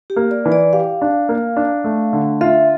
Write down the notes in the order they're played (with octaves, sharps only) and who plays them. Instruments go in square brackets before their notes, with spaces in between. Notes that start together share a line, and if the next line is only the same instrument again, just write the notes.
[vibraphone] G4
[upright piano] A#3
[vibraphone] D5
[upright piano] E3
[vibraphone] D5
[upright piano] G4 [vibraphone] F5
[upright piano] D4
A#3
D4
A3
D3
[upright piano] F4 [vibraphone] E5